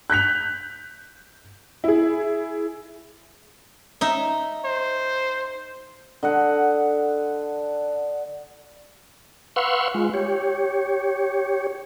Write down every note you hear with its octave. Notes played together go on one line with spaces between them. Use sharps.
F#6 G6 B6 F7
E4 G#4
D#4 E5
C5
D3 D#5 F#5
B4 F5 F#5 C6 C#6 E6
G#3 F4
G4 C#5